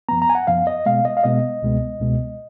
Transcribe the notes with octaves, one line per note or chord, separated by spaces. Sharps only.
F#2 F3 B3 A#5
A#5
G#5
F#5
F#2 F3 B3 F5
D#5
B2 G#3 B3 F5
D#5
F5
B2 G#3 B3 D#5
C#2 B2 G#3 B3
C#2 B2 G#3 B3